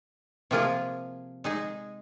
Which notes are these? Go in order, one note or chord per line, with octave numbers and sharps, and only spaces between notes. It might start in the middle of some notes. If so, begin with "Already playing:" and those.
C3 F3 A#3 F4 G#4
G#3 D#4 G#4